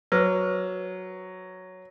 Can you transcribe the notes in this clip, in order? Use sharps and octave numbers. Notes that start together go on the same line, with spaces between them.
F#3 B4 C5 D6